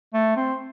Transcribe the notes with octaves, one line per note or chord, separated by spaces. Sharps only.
A3
C4